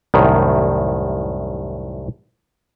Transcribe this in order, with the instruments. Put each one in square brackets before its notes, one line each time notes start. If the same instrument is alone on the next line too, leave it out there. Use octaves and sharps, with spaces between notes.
[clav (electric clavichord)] C2 F#2 A2 D#3